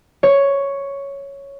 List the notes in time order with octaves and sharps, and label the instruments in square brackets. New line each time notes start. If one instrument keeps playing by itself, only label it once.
[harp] C#5